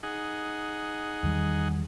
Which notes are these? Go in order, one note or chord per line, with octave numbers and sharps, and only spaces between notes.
D#4 G#4 F#5
E2 D#3 G3